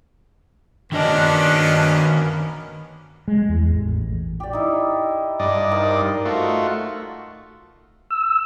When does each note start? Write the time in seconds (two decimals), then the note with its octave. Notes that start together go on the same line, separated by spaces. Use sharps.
0.92 D#3 A#3 B3 C#4 D4 F#4 D#5
3.28 G#3
3.49 E2
3.71 A1
4.40 G4 D5
4.53 D#4 E4
5.39 G2 D5 D#5
5.71 D#4 A#4 C5
6.25 A3 F4 F#4
8.11 E6